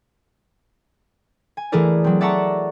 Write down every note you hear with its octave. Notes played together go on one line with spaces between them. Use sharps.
G#5
E3 A3 E4 G#4 A#4 D5
F#3 C4
D5 E5 F#5 A5 A#5 C#6